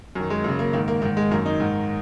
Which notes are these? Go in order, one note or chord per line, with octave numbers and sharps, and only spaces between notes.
F#2 D#3
G#3
F#2 C#3 A#3
A#3
G#2 D#3 A#3
A#3
G#2 D#3 A#3
G#3
F#2 D#3 A#3
D#4
G#2 D#3